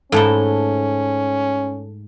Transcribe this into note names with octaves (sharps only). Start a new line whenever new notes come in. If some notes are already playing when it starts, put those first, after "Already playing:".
G#2 A3 C#4 E4 A4 A5 G7